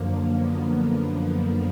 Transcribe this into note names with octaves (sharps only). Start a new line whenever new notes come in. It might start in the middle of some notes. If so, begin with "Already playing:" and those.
Already playing: F#2 D3 F3 A#3
B3
A#3